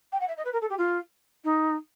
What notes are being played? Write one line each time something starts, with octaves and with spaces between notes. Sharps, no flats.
G5
F#5
E5
D#5
B4
A#4
A4
G4
F4
D#4